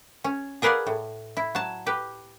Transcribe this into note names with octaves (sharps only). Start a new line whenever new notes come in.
C#4
G#4 A#4 B4 D5 F5 F#5
A2
E4
F#3 A5
G4 B4